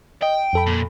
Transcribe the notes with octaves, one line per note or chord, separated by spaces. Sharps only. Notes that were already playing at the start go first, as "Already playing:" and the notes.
D#5 G5
F2 A4 B5
A#2